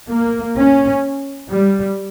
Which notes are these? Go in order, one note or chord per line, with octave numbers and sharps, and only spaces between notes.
A#3
C#4
G3